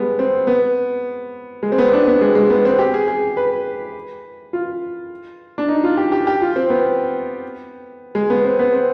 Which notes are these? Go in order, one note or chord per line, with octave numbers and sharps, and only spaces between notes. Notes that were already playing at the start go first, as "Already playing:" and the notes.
Already playing: G3 G#3 B3
C4
B3
G#3
C4
B3
D4
B3
G#3
G#3
B3
C4
G4
G#4
G#4
B4
F4
D4
D#4
F4
G4
G4
G4
F4
C4
B3
G#3
B3
C4
B3
C4